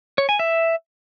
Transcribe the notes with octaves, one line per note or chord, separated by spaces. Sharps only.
C#5
G#5
E5